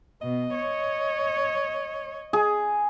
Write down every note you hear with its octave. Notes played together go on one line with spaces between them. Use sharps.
B2 D#5
C#5
G#4